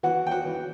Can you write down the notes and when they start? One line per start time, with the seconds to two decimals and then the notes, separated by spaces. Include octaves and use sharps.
0.03 E3 F#4 F#5
0.27 G5
0.31 F#4 F#5
0.45 E3